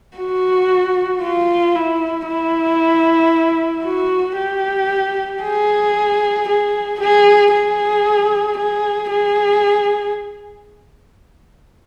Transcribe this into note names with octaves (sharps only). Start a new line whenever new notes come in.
F#4
F4
E4
E4
F#4
G4
G#4
G#4
G#4
G#4
G#4
G#4